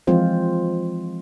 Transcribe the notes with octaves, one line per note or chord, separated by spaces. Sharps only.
E3 F3 G#3 C4 F4 C5